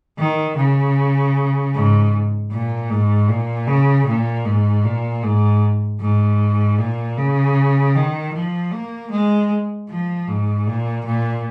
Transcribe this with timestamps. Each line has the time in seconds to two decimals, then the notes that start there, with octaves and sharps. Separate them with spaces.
0.18 D#3
0.56 C#3
1.74 G#2
2.51 A#2
2.90 G#2
3.29 A#2
3.67 C#3
4.06 A#2
4.45 G#2
4.84 A#2
5.23 G#2
6.00 G#2
6.78 A#2
7.17 C#3
7.95 D#3
8.33 F3
8.72 A#3
9.11 G#3
9.89 F3
10.27 G#2
10.67 A#2
11.05 A#2